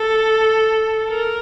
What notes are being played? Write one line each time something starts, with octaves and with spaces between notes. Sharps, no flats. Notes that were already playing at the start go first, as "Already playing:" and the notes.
Already playing: A4
A#4